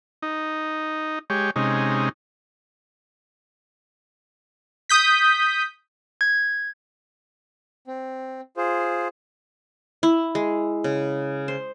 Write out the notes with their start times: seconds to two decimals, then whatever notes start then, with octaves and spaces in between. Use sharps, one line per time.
0.23 D#4
1.30 G#3 G4 C#5
1.56 C3 G#3 C#4 D#4
4.89 D#6 G6 B6
6.21 G#6
7.87 C4
8.57 F4 G#4 C5
10.03 E4
10.35 G#3
10.84 C#3
11.48 C5